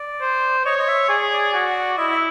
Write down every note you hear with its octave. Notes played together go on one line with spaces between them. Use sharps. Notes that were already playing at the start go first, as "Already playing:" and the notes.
Already playing: D5
C5
C#5 D#5
D#5
E5
G#4 D5
C#5
D5
F#4
E4 D#5
E5